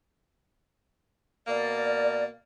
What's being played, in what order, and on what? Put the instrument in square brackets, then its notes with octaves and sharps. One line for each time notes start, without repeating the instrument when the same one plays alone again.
[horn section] B2 A#3 [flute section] D5